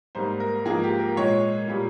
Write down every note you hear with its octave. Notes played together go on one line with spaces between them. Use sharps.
G#2 G3 A#3 C5
A#4
G#2 F3 A#3 G#4
G4
A#4
A#2 G#3 C#5
A#2 G3 A#3